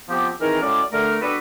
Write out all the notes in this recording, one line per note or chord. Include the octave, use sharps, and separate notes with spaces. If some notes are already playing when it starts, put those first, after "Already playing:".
F3 B3 C4 G4
D#3 E3 C4 D#4 G#4 A#4
A2 F#3 G#3 C#4 D5
D3 A3 A#4 F6
G3 B3 D4 F#4 A4 B4